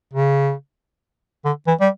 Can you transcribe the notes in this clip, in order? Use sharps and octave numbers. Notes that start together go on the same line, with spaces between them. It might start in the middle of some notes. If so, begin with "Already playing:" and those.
C#3
D3
E3
G3